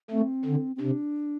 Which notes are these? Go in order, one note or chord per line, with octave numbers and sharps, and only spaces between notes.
A3 C4
D3
C4
C3 D4